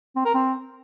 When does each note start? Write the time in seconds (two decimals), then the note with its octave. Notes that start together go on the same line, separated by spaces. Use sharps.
0.16 C4
0.25 A#4
0.34 C4